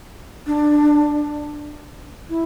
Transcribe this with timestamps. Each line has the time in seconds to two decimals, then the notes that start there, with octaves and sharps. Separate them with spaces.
0.47 D4
2.30 E4